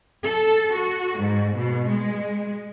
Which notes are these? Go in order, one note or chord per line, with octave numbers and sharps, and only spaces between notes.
A4
F#4
G#2
B2
G#3